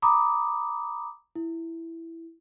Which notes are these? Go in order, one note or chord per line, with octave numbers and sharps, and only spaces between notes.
A#5 B5 D6 D#6
E4